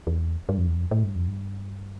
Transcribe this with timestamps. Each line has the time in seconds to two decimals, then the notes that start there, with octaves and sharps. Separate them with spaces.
0.07 E2
0.49 G2
0.57 F2
0.67 E2
0.76 F2
0.91 A2
1.04 G2
1.16 F2
1.28 G2